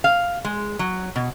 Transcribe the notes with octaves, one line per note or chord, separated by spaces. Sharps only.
F5
G#3
F#3
B2